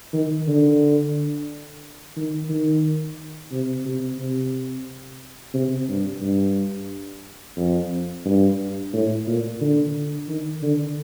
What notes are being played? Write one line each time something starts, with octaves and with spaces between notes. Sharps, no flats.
D#3
D3
D#3
D#3
C3
C3
C3
C3
G2
G2
F2
G2
A2
A#2
D3
D#3
D3